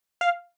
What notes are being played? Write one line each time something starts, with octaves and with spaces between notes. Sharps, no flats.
F5